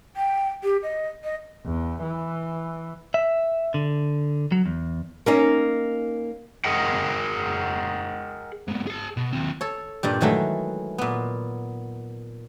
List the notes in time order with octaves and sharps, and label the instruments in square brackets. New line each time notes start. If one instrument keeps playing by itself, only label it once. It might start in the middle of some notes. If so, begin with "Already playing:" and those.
[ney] G5
G4
D#5
D#5
[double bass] E2
E3
[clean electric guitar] E5
D3
F#3
E2
[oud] A#3 C#4 D#4
[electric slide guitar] G#4 A#4 D#5 F#5 G5
[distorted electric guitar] G#2 B2
G#4 A5
B2
D#2 C4
[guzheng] A4 C#5
G2 A#2 G3
D#3 E3 F#3 G#3 A3
A#2 B3